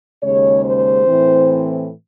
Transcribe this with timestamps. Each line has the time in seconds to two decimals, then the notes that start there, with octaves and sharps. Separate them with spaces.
0.22 D#2 C#3 G#3 C#5
0.64 C5
1.06 A2 E3 C4